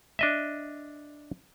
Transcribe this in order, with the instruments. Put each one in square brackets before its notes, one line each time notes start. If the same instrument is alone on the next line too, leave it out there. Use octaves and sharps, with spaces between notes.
[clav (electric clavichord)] D4 D#5 E5